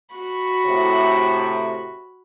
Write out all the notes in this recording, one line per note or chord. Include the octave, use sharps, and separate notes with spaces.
F#4 B5 C#6
A2 C3